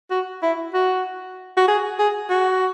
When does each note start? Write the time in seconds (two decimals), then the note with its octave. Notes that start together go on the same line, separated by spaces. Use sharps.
0.10 F#4
0.43 E4
0.74 F#4
1.57 F#4
1.68 G#4
1.99 G#4
2.30 F#4